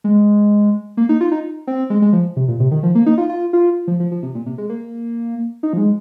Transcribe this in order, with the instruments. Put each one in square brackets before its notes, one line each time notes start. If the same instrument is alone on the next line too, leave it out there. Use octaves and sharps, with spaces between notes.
[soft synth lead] G#3
A#3
D#4
F4
D#4
C4
G#3
G#3
F3
C3
A#2
C3
D#3
F3
A#3
D#4
F4
F4
F4
F3
F3
F3
C3
A#2
C3
G#3
A#3
D#4
F3
G#3